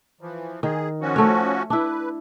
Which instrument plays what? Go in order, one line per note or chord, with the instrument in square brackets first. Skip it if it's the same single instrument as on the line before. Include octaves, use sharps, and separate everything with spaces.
[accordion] E3 F3
[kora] D#3 [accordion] G#4
[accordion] F3 C#4 F#4
[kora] A3 C#5
[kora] D4 E4 [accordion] B4